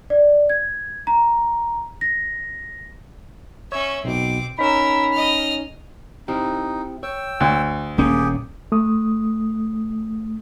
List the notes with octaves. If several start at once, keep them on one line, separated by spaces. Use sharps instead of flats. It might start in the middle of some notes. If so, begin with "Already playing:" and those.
D5
G#6
A#5
A#6
C#4 C#5 E5
B1 B2 C4 D6
C#4 D#4 A#4 B5 E6
D#5 F6
C4 D#4 E4 G4
C#5 G5 E6
D2
D#1 A#3 C#4 G4 G#4 G5
A3 D#6